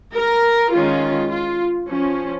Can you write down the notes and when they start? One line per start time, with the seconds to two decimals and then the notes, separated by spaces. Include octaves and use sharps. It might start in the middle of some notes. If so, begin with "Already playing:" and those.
0.15 A#4
0.73 D#3 G#3 C#4 F4
1.31 F4
1.89 F3 C#4